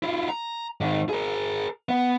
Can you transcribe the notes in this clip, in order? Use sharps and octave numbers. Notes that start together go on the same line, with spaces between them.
E4 F4
A#5
G#2 D#3
G#4 A#4
B3